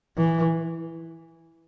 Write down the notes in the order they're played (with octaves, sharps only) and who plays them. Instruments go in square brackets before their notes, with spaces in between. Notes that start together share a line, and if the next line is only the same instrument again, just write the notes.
[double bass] E3